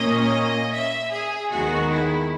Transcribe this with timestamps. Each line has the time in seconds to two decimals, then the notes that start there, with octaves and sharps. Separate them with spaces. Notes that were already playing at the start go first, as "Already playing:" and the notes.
Already playing: A#2 A#3 C#4 D#5
0.72 E5
1.11 G#4
1.50 D#2 D#3 G#3 B3 F#4
1.90 E4